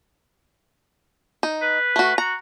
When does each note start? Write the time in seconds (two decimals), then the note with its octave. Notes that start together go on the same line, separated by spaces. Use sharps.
1.43 D#4
1.62 B4
1.96 A3 F#4
2.18 F#4 A#5